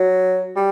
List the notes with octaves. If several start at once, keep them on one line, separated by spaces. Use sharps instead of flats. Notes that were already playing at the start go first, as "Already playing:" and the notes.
Already playing: F#3
G3